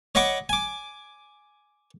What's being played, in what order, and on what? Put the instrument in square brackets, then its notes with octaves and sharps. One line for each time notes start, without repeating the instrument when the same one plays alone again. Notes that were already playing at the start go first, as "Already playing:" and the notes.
[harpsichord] C#5 D#5 F#5 B5 C#6 D6
G#5 D6